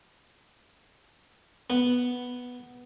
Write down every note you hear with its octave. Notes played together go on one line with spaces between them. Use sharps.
B3